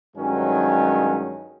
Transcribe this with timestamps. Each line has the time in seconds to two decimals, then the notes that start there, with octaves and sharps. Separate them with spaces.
0.16 G2 D#3 F#3 G#3 C#4